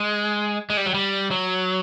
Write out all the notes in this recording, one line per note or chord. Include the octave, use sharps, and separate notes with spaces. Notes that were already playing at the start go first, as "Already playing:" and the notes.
Already playing: G#3
G#3
G3
F#3
G3
F#3